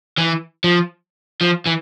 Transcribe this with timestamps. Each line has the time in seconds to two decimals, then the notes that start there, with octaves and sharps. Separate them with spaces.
0.18 E3
0.64 F3
1.41 F3
1.66 E3